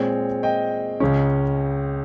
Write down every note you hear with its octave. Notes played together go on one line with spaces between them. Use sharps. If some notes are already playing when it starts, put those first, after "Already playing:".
Already playing: A#2 G#3 C4 C#5
D#5 G5
C#2 C#3 G#3 C#4